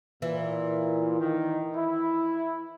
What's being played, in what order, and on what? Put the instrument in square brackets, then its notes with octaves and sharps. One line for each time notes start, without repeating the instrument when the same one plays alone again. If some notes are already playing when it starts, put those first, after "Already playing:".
[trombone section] A#2 [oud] E3
[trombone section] D#3
E4